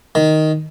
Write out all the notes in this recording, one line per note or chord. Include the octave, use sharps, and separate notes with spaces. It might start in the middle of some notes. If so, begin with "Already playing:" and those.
D#3